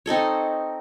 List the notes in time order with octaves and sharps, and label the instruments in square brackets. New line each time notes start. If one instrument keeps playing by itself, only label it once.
[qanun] C4 D#4 A4 C#5